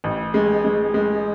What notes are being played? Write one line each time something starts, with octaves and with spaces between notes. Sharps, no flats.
A1
G#3
G#3
G#3